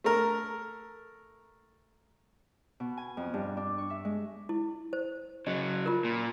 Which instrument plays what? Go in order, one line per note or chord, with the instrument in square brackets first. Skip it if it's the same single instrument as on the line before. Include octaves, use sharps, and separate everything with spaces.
[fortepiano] A3 A#4
[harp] B2
G#5
F2
G2
D4
C#6
E5
G#3
[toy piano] E4
C5
[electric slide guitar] C#3 F#3 [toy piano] D#5
[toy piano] F4 A#4
[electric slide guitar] A#2